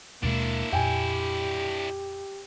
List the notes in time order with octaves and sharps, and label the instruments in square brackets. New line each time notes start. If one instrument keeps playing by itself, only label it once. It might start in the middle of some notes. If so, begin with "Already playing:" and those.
[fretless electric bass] D#2 B2 G#3 [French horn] A#3 [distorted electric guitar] D4 E4
[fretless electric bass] F2 A#2 [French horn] G4 [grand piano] G5 G#5